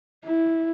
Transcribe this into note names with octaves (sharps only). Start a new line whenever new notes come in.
E4